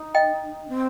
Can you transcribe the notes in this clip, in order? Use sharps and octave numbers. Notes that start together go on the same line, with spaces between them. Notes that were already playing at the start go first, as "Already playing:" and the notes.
Already playing: D#4
D#5 G5
C4